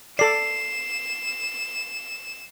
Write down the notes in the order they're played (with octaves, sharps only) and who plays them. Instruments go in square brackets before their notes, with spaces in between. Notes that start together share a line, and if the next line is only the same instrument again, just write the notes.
[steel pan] A4 D5 [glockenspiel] C7 [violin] E7